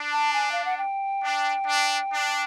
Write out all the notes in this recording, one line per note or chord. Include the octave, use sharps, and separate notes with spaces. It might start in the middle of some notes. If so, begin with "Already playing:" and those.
Already playing: D4
A5
G#5
F5
F#5
G5
D4
D4
D4